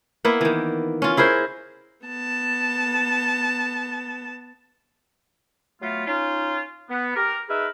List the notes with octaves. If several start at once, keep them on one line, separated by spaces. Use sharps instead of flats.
A#3 B3 E4
D#3 E3
C#4 F4
E4 G#4 A#4 C5
B3 A5
F#3 A3 B3 F4
C#4 D#4 F4
B3
G4 A#4
D#4 G#4 A#4 B4 E5